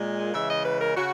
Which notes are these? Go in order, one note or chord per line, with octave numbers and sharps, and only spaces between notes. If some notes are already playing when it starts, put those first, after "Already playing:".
Already playing: A#2 G#3
C#3 E3 G#3 E5
D#5
B4
A#4
C#3 F#4